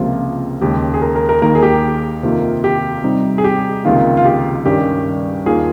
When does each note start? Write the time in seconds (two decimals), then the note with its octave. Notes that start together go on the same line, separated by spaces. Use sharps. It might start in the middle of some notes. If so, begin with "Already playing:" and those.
Already playing: C#2 C3 F3 A#3 F4
0.61 D#2 C#3 G#3 G4
0.94 G#4
1.02 A#4
1.16 A#4
1.29 A#4
1.42 D#2 D#3 A#3 A#4
1.55 G#4
1.63 G4
2.23 F2 C3 D#3 A#3 F4
2.64 G4
3.04 C3 G3 C4 D#4
3.38 G#4
3.44 G4
3.84 C#2 C3 D#3 A#3 F4
4.17 F4
4.25 G4
4.65 G2 D#3 G3 C#4 G4
5.46 D#2 D#3 A#3 F4 G#4